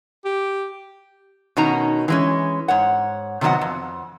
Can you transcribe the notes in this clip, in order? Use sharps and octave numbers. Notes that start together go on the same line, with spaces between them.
G4
B2 D#3 C#4 D#4 A#5
E3 G#3 C#4
G#2 C#5 F#5
C3 D#3 F#3 B3 D#5 F#5
F2